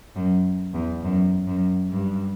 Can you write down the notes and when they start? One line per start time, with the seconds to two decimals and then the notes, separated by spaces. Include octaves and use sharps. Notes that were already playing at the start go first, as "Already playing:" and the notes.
0.16 F#2
0.74 E2
1.03 F#2
1.47 F#2
1.91 G2